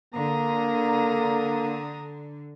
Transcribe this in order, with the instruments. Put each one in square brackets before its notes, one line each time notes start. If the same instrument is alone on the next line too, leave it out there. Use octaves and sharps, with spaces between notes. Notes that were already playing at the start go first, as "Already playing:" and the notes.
[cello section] D3 [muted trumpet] A#3 [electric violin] A#5 D#6